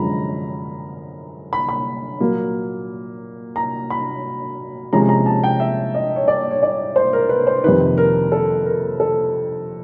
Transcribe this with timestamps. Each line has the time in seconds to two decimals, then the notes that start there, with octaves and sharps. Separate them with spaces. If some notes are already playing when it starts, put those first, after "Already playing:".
Already playing: F#2 D3 F3 G#3 C#4 A#5 B5
1.53 B5
1.69 B5
2.20 A#2 F#3 A#3
3.56 A#5
3.90 B5
4.93 C3 F3 G#3 C#4 A#5
5.09 A#5
5.26 A5
5.44 G5
5.60 E5
5.95 D#5
6.16 C#5
6.28 D5
6.51 C#5
6.63 D5
6.96 C5
7.13 A#4
7.29 B4
7.47 C5
7.64 F2 C3 D#3 B4
7.98 A#4
8.32 A4
8.66 A#4
9.00 A4